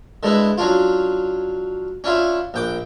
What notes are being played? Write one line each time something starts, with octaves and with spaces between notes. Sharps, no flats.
D3 G#3 B3 E4
F#3 C#4 D4 F4
C#4 D4 E4 F4
A#1 G5 D6